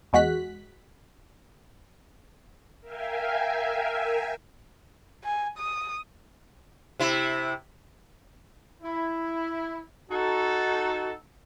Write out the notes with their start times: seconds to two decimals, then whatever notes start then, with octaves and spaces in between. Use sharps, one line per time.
0.13 E2 G#3 F#4 F#6 B6
2.81 A#4 E5 F5 G5 G#5
5.24 G#5
5.58 D#6
7.00 C3 E4
8.83 E4
10.10 D#4 F#4 A4